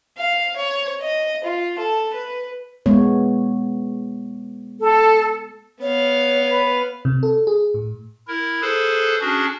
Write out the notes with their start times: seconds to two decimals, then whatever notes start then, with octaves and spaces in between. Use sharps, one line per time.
0.17 F5
0.57 C#5
1.01 D#5
1.44 F4
1.78 A4
2.13 B4
2.86 G#3 B3 C#5
4.81 A4
5.81 B3 C#5 F5
6.51 B4
7.05 C3
7.23 A4
7.47 G#4
7.74 A2
8.28 E4 A#4
8.62 G#4 A4 B4 C5
9.21 C#4 D4 F#4 G#4